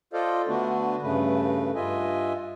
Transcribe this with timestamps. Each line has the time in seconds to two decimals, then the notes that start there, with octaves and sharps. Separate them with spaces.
0.13 F4 A4 C5 D5 D#5 F5
0.48 D3 A3 B3 D4 F#4
1.02 G2 C#3 A3 B4
1.75 G2 F4 D#5 E5 G#5